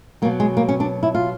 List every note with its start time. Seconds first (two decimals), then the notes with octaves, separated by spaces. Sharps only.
0.22 B2 F#3 A#3
0.40 G#3
0.57 A#3
0.69 C#4
0.80 D4
1.03 E4
1.15 F4